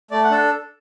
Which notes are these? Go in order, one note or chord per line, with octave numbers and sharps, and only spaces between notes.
A3 D5
F#5
D4 A4